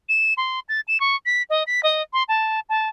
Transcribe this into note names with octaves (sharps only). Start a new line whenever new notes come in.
E7
C6
A6
E7
C#6
B6
D#5
B6
D#5
C6
A5
A5